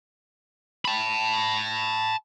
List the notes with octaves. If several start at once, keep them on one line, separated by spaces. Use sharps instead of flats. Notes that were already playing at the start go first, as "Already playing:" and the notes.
A5 B5